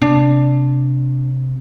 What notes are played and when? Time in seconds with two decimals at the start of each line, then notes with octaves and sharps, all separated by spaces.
0.02 C3 D4